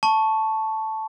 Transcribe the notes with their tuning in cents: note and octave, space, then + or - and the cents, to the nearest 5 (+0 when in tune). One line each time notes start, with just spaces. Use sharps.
A5 +0 C#6 +0